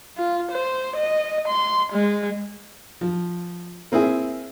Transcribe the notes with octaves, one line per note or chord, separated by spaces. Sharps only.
F4
C5
D#5
C6
G#3
F3
A#3 C4 E4 G#4